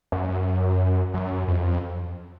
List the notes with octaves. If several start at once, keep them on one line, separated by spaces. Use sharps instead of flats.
F#2
F#2
F2